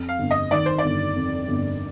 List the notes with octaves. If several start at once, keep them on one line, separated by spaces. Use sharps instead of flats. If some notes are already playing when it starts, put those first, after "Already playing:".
Already playing: F2
F5
G1
D#5
D#3 D5
C5
D5
G1
F2
G1